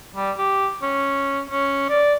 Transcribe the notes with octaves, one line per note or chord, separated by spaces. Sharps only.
G3
G4
C#4
C#4
D5